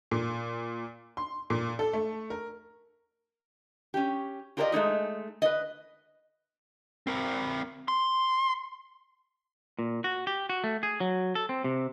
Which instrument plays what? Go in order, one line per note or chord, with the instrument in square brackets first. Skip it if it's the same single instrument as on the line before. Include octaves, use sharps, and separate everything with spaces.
[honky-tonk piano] A#2
C6
A#2
A4
A3
A#4
[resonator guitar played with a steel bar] C#4 G4
F4 G4 A#4 C5 D5 D#5
G#3 A3 D#4 G#4
B4 D#5
[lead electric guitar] C4 A#4
C6
[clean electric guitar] A#2
F#4
G4
F#4
A3
G#4
F#3
A4
C4
C3